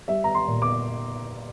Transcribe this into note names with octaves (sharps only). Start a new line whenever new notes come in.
G3 E5
A#5
C6
A#2
D6